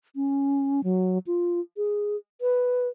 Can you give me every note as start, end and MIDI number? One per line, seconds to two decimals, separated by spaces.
0.16 0.81 61
0.84 1.18 54
1.27 1.60 65
1.77 2.16 68
2.41 2.88 71